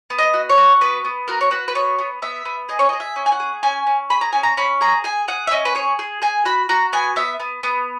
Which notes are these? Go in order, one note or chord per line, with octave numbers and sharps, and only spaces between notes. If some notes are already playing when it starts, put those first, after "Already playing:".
B3
D#5
F#4
C#5
F#4
B3 B4
B3
F#4 A#4
C#5
F#4 B4
B4
B3 C#5
B3
B3 E5
B3
G#4 D#5
C#5
D#5
G#4
E5
C#4
G#5
F#5
G#4
C#4 G#5
C#4
G#4 B5
A#5
C#4 G#5
A#5
C#4 B5
G#4 A#5
G#4 G#5
G#4 F#5
E5
C#4 D#5
B4
G#4 C#5
G#4
G#4 G#5
F#4 B5
F#4 A#5
B3 G#5
B3 E5
B3
B3